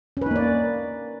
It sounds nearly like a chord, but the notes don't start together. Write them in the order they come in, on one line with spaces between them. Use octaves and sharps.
C#4 B4 D#4 A#3 D5